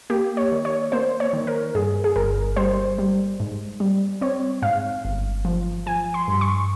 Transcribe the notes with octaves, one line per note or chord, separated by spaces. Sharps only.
A#3 G4
C#5
D#3
C#5
A#3 C5
C#5
D#3
A#4
G2 G#4
G#4
G1 A#4
G3 C5
G3
G#2
G3
C4 C#5
G#2 F5
G1
F3
F3 G#5
C6
G2
C#6